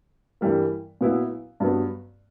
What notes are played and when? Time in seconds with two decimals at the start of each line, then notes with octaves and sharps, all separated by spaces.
0.41 G2 E3 G3 A#3
1.01 A#2 F#3 B3 E4
1.60 G2 F#3 B3